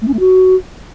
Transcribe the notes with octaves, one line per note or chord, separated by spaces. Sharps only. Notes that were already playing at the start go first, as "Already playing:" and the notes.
A3
C#4
A3
F#4